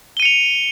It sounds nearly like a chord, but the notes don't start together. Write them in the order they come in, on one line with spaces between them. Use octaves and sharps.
G7 D#7 C#7 F7